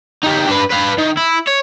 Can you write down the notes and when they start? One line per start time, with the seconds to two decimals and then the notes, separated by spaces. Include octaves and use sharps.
0.24 D#4 G4
0.49 D4 B4
0.71 B4 F5
0.98 D#3
1.17 E4
1.47 C#5